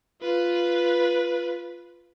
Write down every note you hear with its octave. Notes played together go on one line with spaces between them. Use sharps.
F4 B4